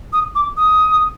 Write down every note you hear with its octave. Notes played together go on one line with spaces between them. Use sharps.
D#6
D6
D#6